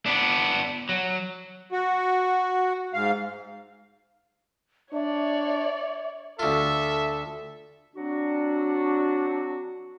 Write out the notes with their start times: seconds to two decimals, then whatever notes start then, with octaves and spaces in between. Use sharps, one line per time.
0.06 B3 D4
0.89 F#3
1.72 F#4
2.94 G#2 F5
4.93 D4 C#5 D5 E5
6.39 D2 F4 A4 E5
7.96 F#3 C4 D4 F#4